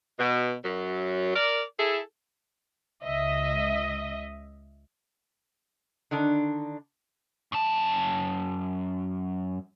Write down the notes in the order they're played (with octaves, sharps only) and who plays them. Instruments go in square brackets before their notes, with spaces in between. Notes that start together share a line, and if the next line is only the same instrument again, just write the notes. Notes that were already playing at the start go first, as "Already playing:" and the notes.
[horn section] B2
F#2 F#3
A#4 D5
E4 G#4 A4
[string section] C#2 D#5 E5
[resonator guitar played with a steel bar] D3 D#3 D4
[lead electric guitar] F#2 A5